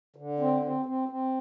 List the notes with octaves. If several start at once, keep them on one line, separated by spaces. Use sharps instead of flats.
D3
C4
C4
C4
C4